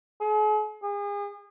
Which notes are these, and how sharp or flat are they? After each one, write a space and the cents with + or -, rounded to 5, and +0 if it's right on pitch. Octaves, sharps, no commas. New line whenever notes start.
G#4 +45
G#4 -35